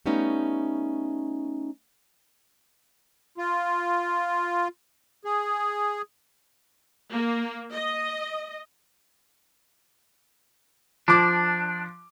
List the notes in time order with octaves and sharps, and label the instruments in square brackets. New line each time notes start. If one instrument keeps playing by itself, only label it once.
[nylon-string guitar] G3 A3 B3 C#4 D#4
[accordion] F4
G#4
[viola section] A#3
D#5
[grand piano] F3 D6 [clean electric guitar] D4